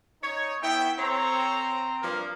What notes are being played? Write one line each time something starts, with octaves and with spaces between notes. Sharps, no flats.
D#4 C#5
B3 E4 E5 G5
C4 A4 C5 C#5 A#5
G2 F3 A#3